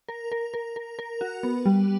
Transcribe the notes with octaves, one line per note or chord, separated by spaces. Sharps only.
A#4
A#4
A#4
A#4
A#4
F#4
B3
G3